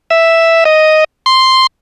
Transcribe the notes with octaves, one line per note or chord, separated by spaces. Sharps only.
E5
D#5
C6